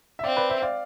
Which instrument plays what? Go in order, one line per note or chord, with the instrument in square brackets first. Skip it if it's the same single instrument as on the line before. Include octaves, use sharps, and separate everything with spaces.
[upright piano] E5
[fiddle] C4 [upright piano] D5 F5
[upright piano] B4 D5
C5 E5
D5 F5